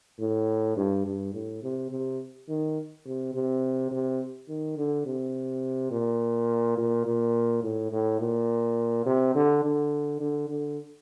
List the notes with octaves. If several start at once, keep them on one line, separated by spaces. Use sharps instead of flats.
A2
G2
G2
A2
C3
C3
D#3
C3
C3
C3
D#3
D3
C3
A#2
A#2
A#2
A2
A2
A#2
C3
D3
D3
D3
D3